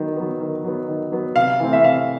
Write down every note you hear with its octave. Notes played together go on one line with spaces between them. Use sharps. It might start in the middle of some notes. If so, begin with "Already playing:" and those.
Already playing: D#3 F#3 B3
F#3 B3
D#3
F#3 B3
D#3
F#3 B3
C3 F5
E3 A3 C4
E5
C3 F5